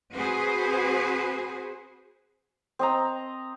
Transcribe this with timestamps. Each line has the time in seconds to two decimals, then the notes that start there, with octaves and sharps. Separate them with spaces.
0.12 C4 F#4 G#4 B4 C5
2.79 C4 D#5 A#5